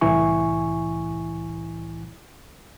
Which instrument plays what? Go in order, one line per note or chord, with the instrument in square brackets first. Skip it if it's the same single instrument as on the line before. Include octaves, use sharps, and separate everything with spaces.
[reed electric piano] C2 A2 E3 E4 G#5 C#6